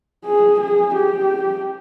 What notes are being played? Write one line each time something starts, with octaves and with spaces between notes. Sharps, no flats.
G#4
G#4
G4